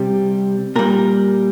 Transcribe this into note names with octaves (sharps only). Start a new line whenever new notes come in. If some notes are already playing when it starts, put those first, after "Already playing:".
Already playing: C3 G3 G4
A#2 G3 A#4